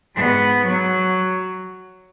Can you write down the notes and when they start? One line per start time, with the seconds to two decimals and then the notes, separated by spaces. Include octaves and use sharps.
0.16 G#2 B3
0.67 F#3